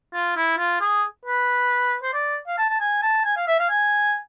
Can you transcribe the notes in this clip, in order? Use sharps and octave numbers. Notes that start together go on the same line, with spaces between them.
F4
E4
F4
G#4
B4
C5
D5
F5
A5
A5
G#5
A5
G#5
F5
E5
F5
G#5